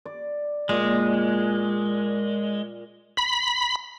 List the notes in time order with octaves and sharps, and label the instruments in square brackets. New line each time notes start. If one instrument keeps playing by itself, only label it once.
[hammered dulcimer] D5
[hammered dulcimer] A#2 [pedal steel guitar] G#3
[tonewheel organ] B5